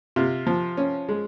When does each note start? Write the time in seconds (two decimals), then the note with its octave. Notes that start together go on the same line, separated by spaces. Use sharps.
0.16 C3 F4
0.47 F3
0.77 C#4
1.09 G#3